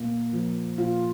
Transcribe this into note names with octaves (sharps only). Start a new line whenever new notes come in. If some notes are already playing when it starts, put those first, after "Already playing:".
Already playing: A#2 A#3
F3
A#2 F4